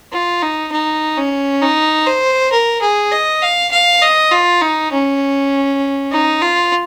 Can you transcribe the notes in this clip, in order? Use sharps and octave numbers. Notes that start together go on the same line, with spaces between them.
F4
D#4
D#4
C#4
D#4
C5
A#4
G#4
D#5
F5
F5
D#5
F4
D#4
C#4
D#4
F4